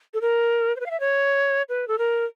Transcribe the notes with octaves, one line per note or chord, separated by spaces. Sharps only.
A4
A#4
C5
B4
F5
E5
C#5
B4
A4
A#4